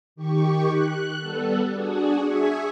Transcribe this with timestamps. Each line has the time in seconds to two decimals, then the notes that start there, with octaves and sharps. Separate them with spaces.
0.16 D#3 G4 C#6
0.69 F#6
1.19 G3 B3 A4
1.71 D4 F#4 G#4
2.25 G#4 E5 G#5 C#6